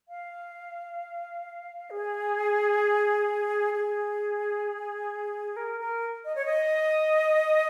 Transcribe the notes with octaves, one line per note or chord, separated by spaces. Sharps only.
F5
G#4
G#4
A#4
A#4
D#5
C#5
D#5